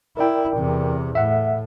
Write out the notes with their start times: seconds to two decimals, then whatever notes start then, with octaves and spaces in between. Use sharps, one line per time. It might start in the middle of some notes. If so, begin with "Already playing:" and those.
0.17 E4 A#4 D5 G5
0.57 E2 C3
1.15 A2 E5 F#5